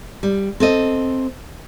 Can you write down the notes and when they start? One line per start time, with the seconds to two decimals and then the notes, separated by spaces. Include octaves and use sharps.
0.23 G3
0.60 C4 A4 D#5